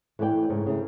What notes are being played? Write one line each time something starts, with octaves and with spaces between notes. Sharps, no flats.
E3 A3 B4 D5 G5
G#2 C#3
C#3 A3